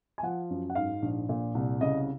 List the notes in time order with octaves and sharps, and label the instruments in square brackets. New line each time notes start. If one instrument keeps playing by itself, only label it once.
[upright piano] G#5
F3 F#5
F#2
F#5
G#2 F5
A#1
A#2
C2
C#3 D#5